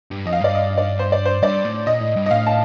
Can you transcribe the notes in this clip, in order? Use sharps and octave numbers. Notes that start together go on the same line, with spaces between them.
G2
F2 D#5
F5
G2 D5
D#5
D5
C5
D5
C5
G2 D5
A2
A#2 D#5
A2
G2
D#5
A2 F5
A5